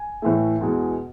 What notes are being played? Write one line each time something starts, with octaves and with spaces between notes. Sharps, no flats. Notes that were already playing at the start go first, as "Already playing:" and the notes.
Already playing: G#5
A2 E3 A3
E2 B2 G#3